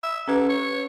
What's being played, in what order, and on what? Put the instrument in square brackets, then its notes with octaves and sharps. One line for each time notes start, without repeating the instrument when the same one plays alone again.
[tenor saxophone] E5
[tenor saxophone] D3 [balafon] C#4 G4 B4
[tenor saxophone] C#5